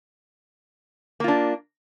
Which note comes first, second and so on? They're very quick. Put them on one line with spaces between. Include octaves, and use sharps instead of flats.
A#3 F4 D4